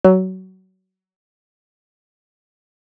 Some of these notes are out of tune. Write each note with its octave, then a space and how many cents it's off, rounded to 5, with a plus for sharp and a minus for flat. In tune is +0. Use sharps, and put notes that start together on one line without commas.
F#3 +20